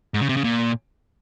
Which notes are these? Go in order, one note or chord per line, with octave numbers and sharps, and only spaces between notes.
G#2
C#3
C3
C#3
A#2